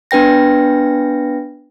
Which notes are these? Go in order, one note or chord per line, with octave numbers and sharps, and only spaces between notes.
B3 D4 B4 G5 A#6